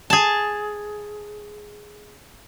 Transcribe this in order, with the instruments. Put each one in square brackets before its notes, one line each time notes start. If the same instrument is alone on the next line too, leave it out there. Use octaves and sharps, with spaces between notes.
[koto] G#4 A5